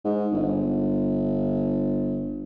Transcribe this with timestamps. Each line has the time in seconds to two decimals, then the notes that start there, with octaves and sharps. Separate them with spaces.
0.04 G#2
0.32 G1